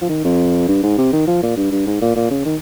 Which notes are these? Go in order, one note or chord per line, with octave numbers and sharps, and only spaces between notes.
F3
D#3
F2
G2
G#2
C3
D#3
F3
A#2
G2
G2
G#2
A#2
A#2
C#3
D#3